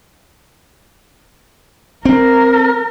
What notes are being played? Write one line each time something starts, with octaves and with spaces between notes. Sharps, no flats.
C4 A#4